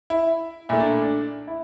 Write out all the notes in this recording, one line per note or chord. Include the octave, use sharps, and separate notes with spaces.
E4
A#2 A3 E4
D4
D4
E4